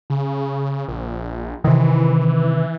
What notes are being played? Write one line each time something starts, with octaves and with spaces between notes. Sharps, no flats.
C#3
A#1
C3 D#3 E3